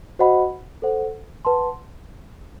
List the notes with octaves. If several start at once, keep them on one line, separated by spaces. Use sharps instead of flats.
F#4 C5 D#5 F#5 B5
A4 C5 F#5
B4 F#5 A5 C6